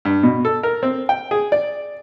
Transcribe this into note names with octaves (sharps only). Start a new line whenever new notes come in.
G2
B2
A4
A#4
C4
G5
G#4
D5